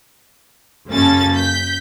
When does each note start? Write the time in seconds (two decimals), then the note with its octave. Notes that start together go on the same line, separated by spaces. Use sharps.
0.88 F#2 C#3 A#3 C#4 A4 A6
1.33 G6 B6